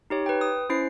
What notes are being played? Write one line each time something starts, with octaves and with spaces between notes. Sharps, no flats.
D#4 G4 C#5
B4 G5
D#6
C#4 E4 C5 C7